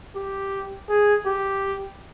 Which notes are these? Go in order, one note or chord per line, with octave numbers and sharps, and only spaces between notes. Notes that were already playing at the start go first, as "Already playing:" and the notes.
G4
G#4
G4